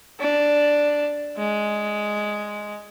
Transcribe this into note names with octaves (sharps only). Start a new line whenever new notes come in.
D4
G#3